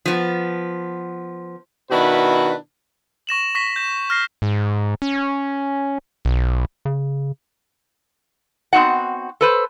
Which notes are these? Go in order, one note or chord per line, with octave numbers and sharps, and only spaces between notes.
F3 B3
B2 D#3 D4 E4 F#4 B4
C#6 A#6 E7 F#7
C#6 A#6 B6
G6 E7
F6 A#6 C7
G#2
C#4
B1
C#3
B3 C4 D#4 F#4 F#5
A4 B4 C5